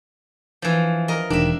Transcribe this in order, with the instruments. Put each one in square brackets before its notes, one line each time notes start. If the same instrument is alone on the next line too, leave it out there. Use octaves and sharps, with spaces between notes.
[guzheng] E3 F3
A#4 D#5
[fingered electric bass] E1 D#3 [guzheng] D4 E5